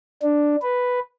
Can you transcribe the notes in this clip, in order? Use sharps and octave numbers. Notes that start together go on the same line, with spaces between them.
D4
B4